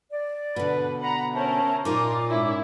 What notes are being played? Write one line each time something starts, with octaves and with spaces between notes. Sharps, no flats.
D5
B2 D3 B4
F#5 A#5 B5
C#4 A#4 C5 E5 A5
A#2 D#4 F4 A#4 D#5 D6
G#2 C#4 E4